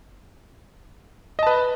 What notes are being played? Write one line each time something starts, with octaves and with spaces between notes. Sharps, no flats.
B4 D#5 A5